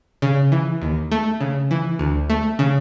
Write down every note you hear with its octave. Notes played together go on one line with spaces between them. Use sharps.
C#3
E3
D#2
A3
C#3
E3
D2
A3
C#3